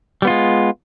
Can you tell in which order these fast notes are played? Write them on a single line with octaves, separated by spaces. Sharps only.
G3 B3 F4 G#3